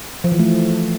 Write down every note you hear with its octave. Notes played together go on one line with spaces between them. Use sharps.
F3
E3
A3